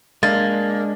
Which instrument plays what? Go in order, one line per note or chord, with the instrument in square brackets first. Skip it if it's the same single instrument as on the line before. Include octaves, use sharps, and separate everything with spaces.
[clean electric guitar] G#3 D4 [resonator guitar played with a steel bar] A#3 [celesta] A6